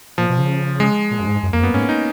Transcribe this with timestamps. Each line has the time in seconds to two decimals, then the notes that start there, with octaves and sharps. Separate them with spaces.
0.18 A#2 F3
0.29 B2
0.39 C#3
0.80 G#3
1.11 A#2
1.20 F#2
1.27 G#2
1.43 F#2
1.53 F2 A#3
1.63 F#2 B3
1.73 G#2 C#4
1.89 D#4